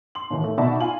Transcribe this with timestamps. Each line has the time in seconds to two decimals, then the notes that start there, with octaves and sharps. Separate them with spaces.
0.15 C6 F#7
0.30 D#2 A2 D#3 E3
0.44 A3
0.58 B2 D#4 D5 E5 A5 B5
0.80 F4 G#5 F#7